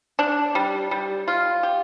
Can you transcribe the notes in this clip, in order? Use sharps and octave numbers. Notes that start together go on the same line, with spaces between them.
D4
G3
G3
F4
G4